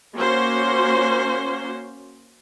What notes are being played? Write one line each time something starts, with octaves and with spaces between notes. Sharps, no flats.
A#3 C#4 F#4 C5